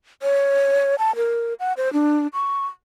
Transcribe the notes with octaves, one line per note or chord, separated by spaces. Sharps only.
C#5
A5
A#4
F#5
C5
D4
C#6